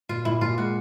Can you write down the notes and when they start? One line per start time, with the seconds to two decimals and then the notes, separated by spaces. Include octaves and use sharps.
0.09 A#2 F4
0.25 A#2 E4
0.41 A#2 F4
0.58 G#3 F#4